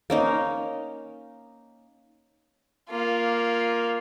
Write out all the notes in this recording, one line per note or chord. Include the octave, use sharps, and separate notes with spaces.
A#3 C#4 D#4
A#3 F4